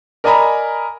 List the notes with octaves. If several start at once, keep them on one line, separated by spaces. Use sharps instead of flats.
A#4 D5 D#5 G#5 A#5 B5